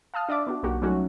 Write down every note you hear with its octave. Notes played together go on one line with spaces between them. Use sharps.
F5 A5 D#6 F6
D4 D5 E5 D6
B3 D4 F#4
B1 A#3 F#4 G4
F#3 G3 A3 C#4 D#4 F#4